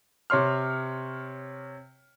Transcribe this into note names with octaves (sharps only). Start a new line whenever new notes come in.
C3 C#5 C6 F6